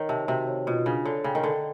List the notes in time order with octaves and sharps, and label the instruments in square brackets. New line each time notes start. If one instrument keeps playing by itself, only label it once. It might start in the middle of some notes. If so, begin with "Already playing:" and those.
Already playing: [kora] D#3 [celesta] C#5
[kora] C3 [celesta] A5
[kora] C3 [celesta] F#4
[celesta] C#5
[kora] B2 [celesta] F4
[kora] C#3 [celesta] D4
[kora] D3 [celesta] C#5
[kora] C#3 [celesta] G5
[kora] D#3
[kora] D3 [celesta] D5